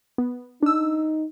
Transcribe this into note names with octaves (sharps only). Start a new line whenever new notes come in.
B3
D4 D#4 E6